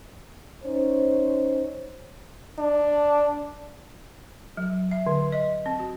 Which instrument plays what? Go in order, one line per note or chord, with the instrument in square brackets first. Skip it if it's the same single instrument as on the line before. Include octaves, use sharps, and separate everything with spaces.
[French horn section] C#4 D#4 C5
[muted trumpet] D4
[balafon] F#3
E5
D3
D#5
C4
F#4